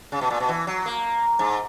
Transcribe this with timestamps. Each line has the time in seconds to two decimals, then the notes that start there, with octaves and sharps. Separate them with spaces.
0.12 C#3
0.21 B2
0.30 A#2
0.40 B2
0.48 E3
0.67 F#3
0.86 A#3
1.39 G#2